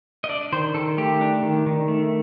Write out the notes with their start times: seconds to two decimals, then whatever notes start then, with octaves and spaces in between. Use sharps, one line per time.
0.24 D#5
0.29 D4 D5
0.52 D#3 C5
0.74 D#3 A4
0.98 A3 G4
1.21 D4
1.42 D#3
1.66 D#3
1.88 A3